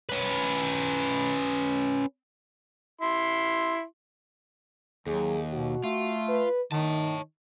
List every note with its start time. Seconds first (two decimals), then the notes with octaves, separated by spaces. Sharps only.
0.09 C#4 B4
3.01 E4 C6
5.07 D#2 F#3 G#4
5.53 B2 F#4
5.84 A3 F4
6.29 B4
6.72 D#3 D#4 C#5 A5